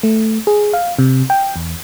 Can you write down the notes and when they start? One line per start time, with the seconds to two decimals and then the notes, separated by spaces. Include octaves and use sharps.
0.03 A3
0.47 G#4
0.73 F5
0.99 C3
1.30 G5
1.56 E2